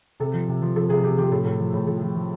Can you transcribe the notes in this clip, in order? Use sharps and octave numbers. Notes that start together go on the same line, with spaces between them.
C3 A4
F3
C3
F3
F3 A4
C3 G#4
C3 G4
F3 G4
A2 A4
A2
F3
A2
F3 A4
F3
F3